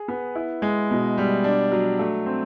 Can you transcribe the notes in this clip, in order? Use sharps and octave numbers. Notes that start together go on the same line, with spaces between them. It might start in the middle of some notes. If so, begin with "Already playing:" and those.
Already playing: G#4
B3
E4
G#3
B2
G3
D4
F#3
A3
C4